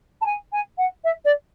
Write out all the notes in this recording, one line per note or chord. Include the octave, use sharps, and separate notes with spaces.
A5
G#5
G#5
F#5
E5
D5